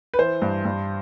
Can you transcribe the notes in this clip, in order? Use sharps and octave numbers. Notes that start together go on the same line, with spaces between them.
B4
E3 C5
G2
G2